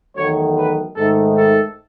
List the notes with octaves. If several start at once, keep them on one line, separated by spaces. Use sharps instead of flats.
E2 D#3 F#3 A3 C#5
B4
G#2 D#3 A3 A4
A4